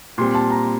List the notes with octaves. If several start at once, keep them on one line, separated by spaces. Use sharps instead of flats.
A#2 G3 C4 C6
A5
A#5